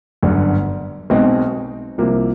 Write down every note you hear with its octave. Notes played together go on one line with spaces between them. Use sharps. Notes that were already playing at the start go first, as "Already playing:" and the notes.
G1 F#2 D3
B1 B2 G#3 C4 D#4
C2 C3 F3 A#3